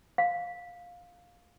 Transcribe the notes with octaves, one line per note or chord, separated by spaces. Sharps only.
F5